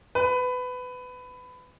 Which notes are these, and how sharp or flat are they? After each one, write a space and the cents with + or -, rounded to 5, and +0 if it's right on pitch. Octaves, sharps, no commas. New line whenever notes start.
B4 +20